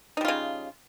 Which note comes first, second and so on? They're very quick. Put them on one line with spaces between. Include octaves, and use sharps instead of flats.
D#4 G3 F4 C#3